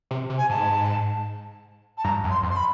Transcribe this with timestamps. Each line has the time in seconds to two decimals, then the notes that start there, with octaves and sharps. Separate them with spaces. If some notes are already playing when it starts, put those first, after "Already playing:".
0.11 C3
0.30 C3
0.38 G#5
0.50 G#2 A5
1.98 A5
2.04 G2 A#5
2.24 F#2
2.30 C6
2.43 F2
2.50 C6
2.56 B5